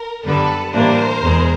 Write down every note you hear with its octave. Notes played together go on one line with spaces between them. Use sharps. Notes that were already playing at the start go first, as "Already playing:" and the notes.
Already playing: A#4
F#2 D3 G3 B3 D4 A4 B4
A2 E3 G3 A#3 D4 A#4 C5
E2 B2 G#3